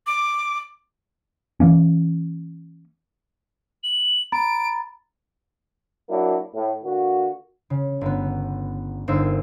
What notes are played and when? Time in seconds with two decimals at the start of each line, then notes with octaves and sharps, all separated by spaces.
0.07 D6
1.60 E3 F3 A#3 C#4
3.83 F#7
4.32 A#5 B5 A6 D7
6.09 F#3 A#3 D4 E4 F#4
6.54 A2
6.84 D3 A#3 F#4
7.70 C#3
8.01 G1 B3
9.08 G1 A#3 D#4 C5 E6 E7